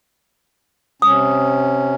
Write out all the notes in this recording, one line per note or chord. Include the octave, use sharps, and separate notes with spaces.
C3 C#4 D#6